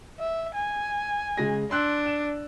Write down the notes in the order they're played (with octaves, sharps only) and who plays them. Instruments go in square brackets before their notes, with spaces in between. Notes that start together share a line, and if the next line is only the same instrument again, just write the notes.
[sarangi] E5
G#5
[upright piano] C#3 G#3 A#6
[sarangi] D4 [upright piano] C6 E6 F#6
[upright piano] E7